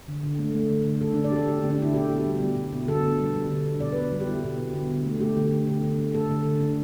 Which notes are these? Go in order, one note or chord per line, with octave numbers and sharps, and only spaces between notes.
D3
D3
A3
A3
D3
D3
D3 A4
D3 D4
D5
A3 G4 A4
A3 G4
D4
D3
D4
D3 E4
B2 G4
B2
G3
G3
B2
B2
D3 A4
D3
G3
G3
D3
D3
B2 D5
B2 B4
G3
G4
G3 E4
B2
B2
D3
D3
A3
A3 G4
D3
D3
D3
D3
A3
A3 A4
D3
D3
D3